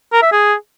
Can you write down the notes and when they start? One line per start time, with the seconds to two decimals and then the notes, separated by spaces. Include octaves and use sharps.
0.13 A#4
0.23 E5
0.32 G#4